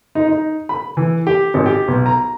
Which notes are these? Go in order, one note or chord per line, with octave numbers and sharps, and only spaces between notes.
D#4
D#4
B5
E3
G4
G#1
G4
B1
A#5